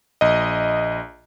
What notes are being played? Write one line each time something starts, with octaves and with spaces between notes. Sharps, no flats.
A#1 D#5